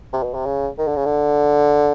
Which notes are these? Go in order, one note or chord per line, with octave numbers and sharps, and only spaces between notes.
C3
B2
C3
C#3
D#3
D3
C#3
D3